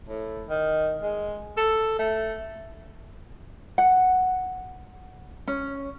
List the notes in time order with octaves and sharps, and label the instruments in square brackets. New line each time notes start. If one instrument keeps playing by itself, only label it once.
[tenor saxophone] A2
D#3
G#3
A4
A3
[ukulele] F#5
C#4